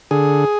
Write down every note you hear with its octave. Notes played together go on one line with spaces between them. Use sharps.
D3 G#4